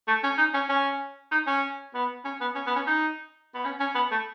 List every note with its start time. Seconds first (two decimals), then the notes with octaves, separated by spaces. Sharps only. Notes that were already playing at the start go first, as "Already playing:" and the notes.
0.08 A3
0.23 C#4
0.38 D#4
0.54 C#4
0.69 C#4
1.32 D#4
1.47 C#4
1.94 B3
2.25 C#4
2.41 B3
2.55 C#4
2.67 B3
2.76 C#4
2.87 D#4
3.55 B3
3.65 C#4
3.80 C#4
3.95 B3
4.11 A3